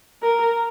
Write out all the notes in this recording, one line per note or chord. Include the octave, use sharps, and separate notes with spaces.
A#4